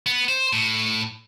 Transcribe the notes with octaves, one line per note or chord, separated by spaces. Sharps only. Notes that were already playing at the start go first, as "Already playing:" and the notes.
B3
C5
A2